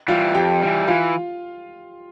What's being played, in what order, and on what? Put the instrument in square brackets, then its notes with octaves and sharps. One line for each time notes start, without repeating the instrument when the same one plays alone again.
[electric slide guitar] E3 G3 [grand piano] F4 F5
[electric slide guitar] F2 [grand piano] G4 G5
[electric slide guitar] E3 G3
[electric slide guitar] E3 [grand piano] F4 F5